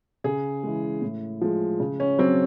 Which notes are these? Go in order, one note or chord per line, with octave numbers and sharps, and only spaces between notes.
C#3 G#4
E3 G#3
A2
F3 G#3
C#3
C#4
F#3 C4